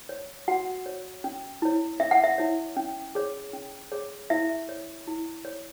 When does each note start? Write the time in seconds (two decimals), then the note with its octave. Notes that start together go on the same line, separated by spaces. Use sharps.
0.09 C#5
0.48 F#4 F#5
0.86 C#5
1.24 C#4
1.62 E4 C#5
2.00 C#4 E5
2.11 F#5
2.24 E5
2.38 E4 C#5
2.77 C#4
3.15 G#4 C#5
3.53 C#4
3.92 G#4 C#5
4.30 E4 E5
4.69 C#5
5.07 E4
5.45 C#5